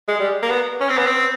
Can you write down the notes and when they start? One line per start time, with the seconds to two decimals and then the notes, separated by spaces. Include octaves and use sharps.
0.08 G#3
0.20 G3
0.43 A#3
0.50 B3
0.80 C#4
0.89 C4
0.97 B3
1.06 C4